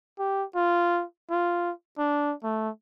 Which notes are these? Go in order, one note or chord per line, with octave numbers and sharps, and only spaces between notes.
G4
F4
F4
D4
A3